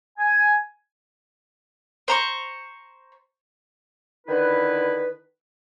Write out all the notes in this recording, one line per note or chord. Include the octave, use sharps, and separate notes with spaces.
G#5
C5 A#5 C#6
D3 D#3 E4 B4